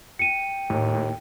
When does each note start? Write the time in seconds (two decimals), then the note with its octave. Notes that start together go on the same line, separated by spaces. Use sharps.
0.19 G5 C#7 D#7
0.70 D#2 A2